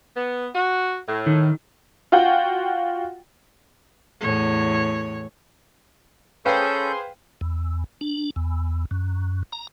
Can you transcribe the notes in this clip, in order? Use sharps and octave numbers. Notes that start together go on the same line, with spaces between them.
B3
F#4
A2
D#3
F4 F#4 F#5 G5
E2 A2 C#5
C#4 G#4 A4 B4 C5 F5 G5 G6
E2
D4
E2
F#2
A#5